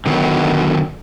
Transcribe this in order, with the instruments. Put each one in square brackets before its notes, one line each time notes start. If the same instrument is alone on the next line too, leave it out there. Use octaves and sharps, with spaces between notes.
[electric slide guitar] D3 D#3 F#3 B3